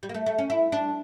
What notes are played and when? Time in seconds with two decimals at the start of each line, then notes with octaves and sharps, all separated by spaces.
0.03 G3
0.09 A#3
0.14 A3
0.26 A3
0.38 C#4
0.50 E4
0.72 D4